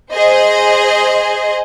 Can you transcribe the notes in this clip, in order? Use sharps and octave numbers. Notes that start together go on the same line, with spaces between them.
G#4 C5 D#5